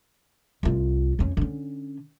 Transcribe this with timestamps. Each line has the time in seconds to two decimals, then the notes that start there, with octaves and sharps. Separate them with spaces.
0.63 C2 F4
1.19 F2 C#4
1.37 D3 C#4